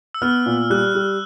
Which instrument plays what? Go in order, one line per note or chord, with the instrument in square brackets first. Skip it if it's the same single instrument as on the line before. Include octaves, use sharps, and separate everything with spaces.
[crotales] E6
[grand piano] B3 [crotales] F6
[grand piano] A#2
[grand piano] G3 [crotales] F#6
[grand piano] G3